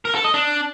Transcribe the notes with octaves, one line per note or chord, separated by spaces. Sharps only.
A#4
A4
D#5
D4